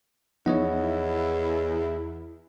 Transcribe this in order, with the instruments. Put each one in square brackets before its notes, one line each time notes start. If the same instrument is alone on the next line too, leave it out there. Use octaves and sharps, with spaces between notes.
[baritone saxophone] E2 [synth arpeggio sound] F3 B3 D#4 [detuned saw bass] E4 [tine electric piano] C#5 D#5 F#5